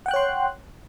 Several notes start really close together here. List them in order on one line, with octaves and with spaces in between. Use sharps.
F#5 G5 F#6 C#5 C6